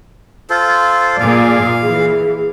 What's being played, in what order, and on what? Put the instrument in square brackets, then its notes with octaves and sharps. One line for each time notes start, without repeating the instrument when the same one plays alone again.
[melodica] F4 A4 C5
[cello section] A#2 G#4 D5 [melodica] F5
[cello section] E3 [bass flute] G#4